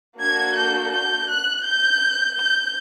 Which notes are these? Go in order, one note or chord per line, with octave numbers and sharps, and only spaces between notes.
A#3 D4 F#4 A4 G#6
G6
G6
F#6
G6
G6